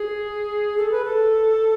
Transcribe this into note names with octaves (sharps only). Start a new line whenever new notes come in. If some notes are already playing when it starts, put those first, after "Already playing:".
Already playing: G#4
A4
B4
A4